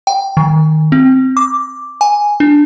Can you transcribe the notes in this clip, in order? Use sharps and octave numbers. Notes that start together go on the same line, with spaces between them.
G5
D#3
C4
D6
G#5
D4